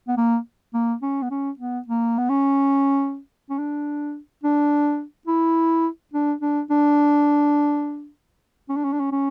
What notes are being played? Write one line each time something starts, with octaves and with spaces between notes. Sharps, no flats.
B3
A#3
A#3
C#4
B3
C#4
B3
A#3
B3
C#4
C#4
D4
D4
E4
D4
D4
D4
C#4
D4
C#4
D4
C#4
C#4